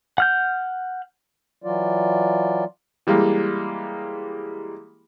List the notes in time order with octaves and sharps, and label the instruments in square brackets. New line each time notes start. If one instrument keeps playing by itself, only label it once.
[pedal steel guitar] F#5 F6 G6
[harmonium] E3 F#3 F4 D5
[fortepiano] E3 G3 G#3 A#3